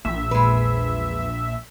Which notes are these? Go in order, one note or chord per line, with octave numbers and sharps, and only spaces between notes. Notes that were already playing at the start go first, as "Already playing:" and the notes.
A#1 A#3 E5
E2 A#2 G#3 B4